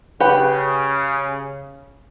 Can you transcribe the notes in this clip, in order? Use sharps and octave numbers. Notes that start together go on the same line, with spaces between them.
C#3 G4 B4 F#5